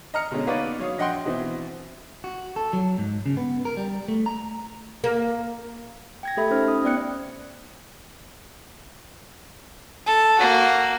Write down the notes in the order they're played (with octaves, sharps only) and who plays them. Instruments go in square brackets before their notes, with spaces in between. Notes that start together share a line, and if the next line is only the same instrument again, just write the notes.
[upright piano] D#5 A#5 F6 C#7
B2 D3 G#3 C#4
A#3 B3 D#4 B4 C#5 D5
F#3 C#5 F5 D#6
A#1 D#5 F#5 G5 C6
B2 E3 C4
[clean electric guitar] F#4
A4
F#3
G#2
C#3
B3
A#4
G3
A3
A#5
[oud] A#3
[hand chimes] G5 G#6 A#6
A3 G4 A4 E5 B5
C#4 D#4 C5 F6
D#6
B3 D5 G5 F#6 C#7
[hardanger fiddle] A4
A#3 F#4